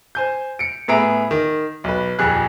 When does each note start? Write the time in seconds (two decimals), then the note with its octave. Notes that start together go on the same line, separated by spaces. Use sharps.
0.15 C5 G#5 G6
0.59 C#7 D7
0.88 A2 B3 G#4 E5 A#5 D7
1.31 D#3
1.84 B1 B4
2.19 D#1 F2 G#4 F#6